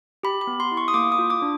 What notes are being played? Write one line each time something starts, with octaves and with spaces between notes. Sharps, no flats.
G4 B5
B5
B3
C6
E4
C#6
D#6
A#3 D6
D#6
F4
D6
D4